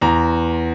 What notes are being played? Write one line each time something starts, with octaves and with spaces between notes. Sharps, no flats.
E2 A#5